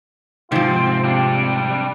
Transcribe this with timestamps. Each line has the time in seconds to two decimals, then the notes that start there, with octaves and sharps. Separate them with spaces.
0.52 G#2 C3 F3 C4 F4
1.04 G3 D4 G4